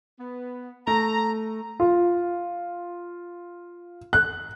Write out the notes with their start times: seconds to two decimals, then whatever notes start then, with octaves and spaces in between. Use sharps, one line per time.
0.20 B3
0.87 A3 A#5
1.80 F4
4.13 F#6